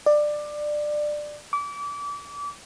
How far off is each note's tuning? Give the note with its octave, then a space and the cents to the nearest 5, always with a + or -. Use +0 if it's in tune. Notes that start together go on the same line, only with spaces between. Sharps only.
D5 +20
D6 -30